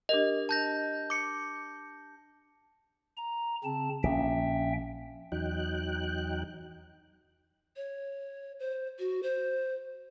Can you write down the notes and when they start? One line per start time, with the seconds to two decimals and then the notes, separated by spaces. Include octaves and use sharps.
0.09 D4 G4 A#4 D#5
0.49 A5 G6 A#6
1.10 D6 C#7
3.17 A#5
3.64 C#3 C4 A5
4.04 A#1 C#4 E5 G5
5.32 E2 F#3 D#4 G5 F#6
7.76 C#5
8.60 C5
8.99 F#4
9.23 C5